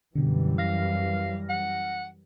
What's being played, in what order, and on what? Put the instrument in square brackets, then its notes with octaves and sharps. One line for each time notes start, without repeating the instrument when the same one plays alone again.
[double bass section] F#2 E3 G3 [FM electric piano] B2 D3
[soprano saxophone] F5 [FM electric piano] F6 A#6
[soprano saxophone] F#5